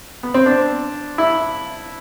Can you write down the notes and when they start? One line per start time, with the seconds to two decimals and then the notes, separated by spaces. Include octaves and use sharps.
0.23 B3
0.34 C4
0.46 D4
1.18 E4